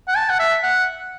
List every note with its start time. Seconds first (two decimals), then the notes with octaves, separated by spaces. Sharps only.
0.08 F#5
0.16 A5
0.29 F#5
0.39 E5
0.63 F#5